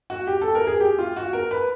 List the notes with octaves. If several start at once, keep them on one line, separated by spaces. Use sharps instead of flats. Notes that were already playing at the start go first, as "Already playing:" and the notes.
F#4
G4
A4
A#4
G#4
G4
F4
F#4
A#4
B4